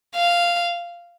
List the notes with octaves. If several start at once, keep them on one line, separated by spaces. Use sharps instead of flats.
F5